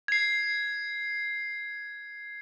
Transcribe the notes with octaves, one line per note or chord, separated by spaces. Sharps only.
G#6 C7